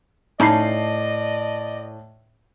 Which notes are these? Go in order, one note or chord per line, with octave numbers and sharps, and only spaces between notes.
A2 C#4 D#4 D5 D#5 A5 B5 C7